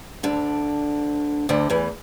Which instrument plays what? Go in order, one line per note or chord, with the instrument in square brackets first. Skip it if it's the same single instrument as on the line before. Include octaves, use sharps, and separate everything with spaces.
[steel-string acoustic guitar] D2 D3
D2 D3
E2 E3